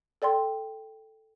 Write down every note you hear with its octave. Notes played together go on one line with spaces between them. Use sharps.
A4 D5 G5 C6